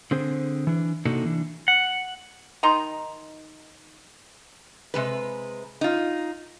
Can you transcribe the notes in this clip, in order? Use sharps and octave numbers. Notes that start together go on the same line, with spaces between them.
D3 C4 G#4 C5
E3 D4
C3 A#3 D4 D#4 F#4 A4
E3 D4
F#5
D#3 D#4 A#5 C6
C3 G#3 B4
D#4 F4